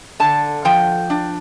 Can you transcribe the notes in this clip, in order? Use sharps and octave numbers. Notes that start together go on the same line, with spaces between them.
D3 A5
F3 G5
D4